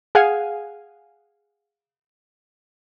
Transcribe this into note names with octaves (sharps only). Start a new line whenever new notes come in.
G#4 F5 F#5 G#5